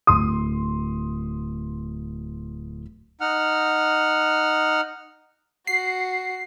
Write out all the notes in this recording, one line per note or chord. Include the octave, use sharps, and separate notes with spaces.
D1 C6 D#6
D#4 F#5 F6
F#4 C7